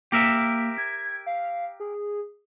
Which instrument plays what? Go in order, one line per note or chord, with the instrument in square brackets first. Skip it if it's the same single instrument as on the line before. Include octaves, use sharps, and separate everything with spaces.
[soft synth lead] A#3 [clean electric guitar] G4 A#4 E5
[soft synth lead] G#6
F5
G#4